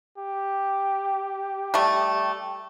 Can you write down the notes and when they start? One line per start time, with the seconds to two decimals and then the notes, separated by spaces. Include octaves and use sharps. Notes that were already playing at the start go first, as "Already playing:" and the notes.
0.18 G4
1.74 G3 A3